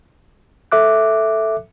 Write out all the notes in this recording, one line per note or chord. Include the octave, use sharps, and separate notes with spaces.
A4 E5 D6 F#6